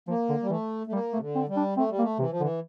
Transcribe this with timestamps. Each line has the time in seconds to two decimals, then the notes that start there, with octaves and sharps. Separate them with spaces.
0.08 F3 A#3
0.29 D3
0.43 G3
0.50 E3 A3
0.87 A3
0.92 G3 A#3
1.13 C3 A3
1.20 D3
1.35 C4
1.49 G3
1.56 D4
1.77 A3 C4
1.90 G3
1.99 A#3
2.02 A3
2.19 C3 E3
2.30 F3
2.40 D3 E3